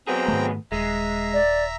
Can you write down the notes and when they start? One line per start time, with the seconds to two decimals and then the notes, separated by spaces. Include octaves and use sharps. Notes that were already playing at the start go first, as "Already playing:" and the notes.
0.07 F#3 B3 C4 G#4 G5 A#5
0.28 G#2 D#3 A3
0.72 D#1 G#3 E5 A#5
1.33 D5